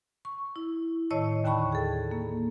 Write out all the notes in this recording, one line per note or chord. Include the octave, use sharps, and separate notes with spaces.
C#6
E4
A2 D#3 C#5 D#5 A5 E6
D#2 D3 G5 A5 B5 C#6
G#4 A4
A#3